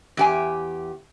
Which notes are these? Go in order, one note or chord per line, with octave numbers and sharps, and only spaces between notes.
E2 G4 G#5